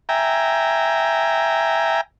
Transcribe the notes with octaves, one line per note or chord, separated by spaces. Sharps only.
E5 G5 G#5 A#5